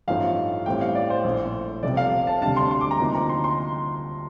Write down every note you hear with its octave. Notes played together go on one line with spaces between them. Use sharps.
A1 G2 F3 A3 D#4 F5
A1 A2 G3 C4 G5
F5
D5
C5
A#1 A2 A3
F1 F2 C3 G3 D5
F5
A5
D2 C3 G3 D4 A5
C6
C6
D6
A#5
D2 C3 F3 A#3 D#4
A#5
C6
C6